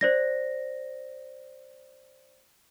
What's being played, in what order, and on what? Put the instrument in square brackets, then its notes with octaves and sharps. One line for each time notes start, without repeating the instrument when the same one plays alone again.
[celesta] C5 D5 A#6